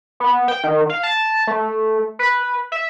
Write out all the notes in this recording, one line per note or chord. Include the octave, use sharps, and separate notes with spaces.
B3
G5
D#3
F5
A5
A3
B4
E5